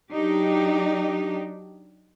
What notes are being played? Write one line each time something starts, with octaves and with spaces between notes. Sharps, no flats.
F#3 D4 D#4 G4